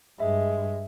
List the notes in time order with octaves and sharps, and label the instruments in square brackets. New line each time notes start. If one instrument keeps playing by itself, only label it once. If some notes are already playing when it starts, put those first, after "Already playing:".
[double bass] G2 [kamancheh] G#3 [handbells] E5